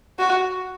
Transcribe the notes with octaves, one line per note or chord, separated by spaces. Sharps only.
F#4